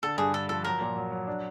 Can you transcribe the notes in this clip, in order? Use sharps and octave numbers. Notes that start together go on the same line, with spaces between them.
D3 A4
G2 G#4
D3 A4
F3 A4
F#3 A#4
A#2
F#3
F#3
D4